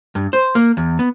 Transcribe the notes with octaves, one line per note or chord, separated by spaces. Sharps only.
G2
C5
A#3
E2
B3